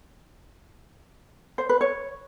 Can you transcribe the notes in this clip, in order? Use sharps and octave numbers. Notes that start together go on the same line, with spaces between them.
C5
B4
C#5